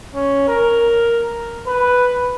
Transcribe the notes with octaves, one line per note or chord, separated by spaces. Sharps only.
C#4
A#4
B4